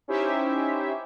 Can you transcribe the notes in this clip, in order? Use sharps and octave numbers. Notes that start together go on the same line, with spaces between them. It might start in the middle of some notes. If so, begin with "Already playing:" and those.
C#4 D#4 E4 G4 C5 E5